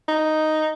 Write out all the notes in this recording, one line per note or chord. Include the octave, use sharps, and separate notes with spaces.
D#4